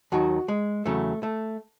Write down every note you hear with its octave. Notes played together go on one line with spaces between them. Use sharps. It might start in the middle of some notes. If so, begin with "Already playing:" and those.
D#2 D#3 F#3 F#4
G#3
E2 C#3 F#3 A3
A3